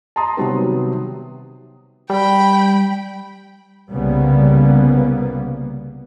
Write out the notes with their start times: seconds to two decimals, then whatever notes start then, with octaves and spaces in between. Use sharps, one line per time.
0.16 A5 A#5 C6 D#6
0.37 C3 D#3 F#3 G3 B3
2.10 G3 G5 B5
3.90 C2 C#3 G3 A#3 B3